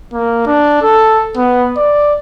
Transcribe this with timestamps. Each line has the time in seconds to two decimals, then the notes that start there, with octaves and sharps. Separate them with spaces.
0.13 A#3
0.47 D4
0.82 A4
1.36 B3
1.77 D5